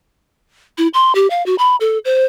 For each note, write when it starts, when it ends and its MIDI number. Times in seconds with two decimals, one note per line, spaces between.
0.78 0.88 64
0.94 1.13 84
1.15 1.29 67
1.30 1.45 77
1.46 1.55 66
1.58 1.76 83
1.80 1.98 69
2.05 2.25 72